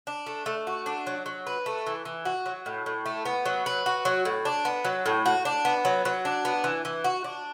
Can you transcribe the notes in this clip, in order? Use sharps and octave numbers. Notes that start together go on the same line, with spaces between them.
D4
A3
A3
F#4
D4
F#3
F#3
B4
A3
E3
E3
F#4
F#3
A2
A2
A3
B3
F#3
B4
F#4
F#3
A2
D4
B3
F#3
A2
F#4
D4
B3
F#3
F#3
D4
B3
E3
E3
F#4
D4